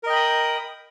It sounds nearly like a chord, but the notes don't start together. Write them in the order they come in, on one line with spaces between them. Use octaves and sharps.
A#4 D#5 G5 B5 D#6